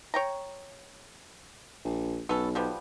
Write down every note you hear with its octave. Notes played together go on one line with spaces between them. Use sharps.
C#5 G5 A#5
A#1
B1 B3 C#4 A4
F3 G3 B3